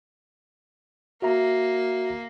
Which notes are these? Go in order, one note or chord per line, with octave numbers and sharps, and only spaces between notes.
A#3 F#4 E5 A#5